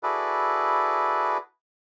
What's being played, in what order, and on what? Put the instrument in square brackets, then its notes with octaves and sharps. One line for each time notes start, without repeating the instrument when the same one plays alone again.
[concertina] E4 F#4 G#4 A4 B4 D5